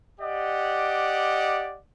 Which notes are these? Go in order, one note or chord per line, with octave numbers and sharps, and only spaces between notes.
G4 D5 D#5 F#5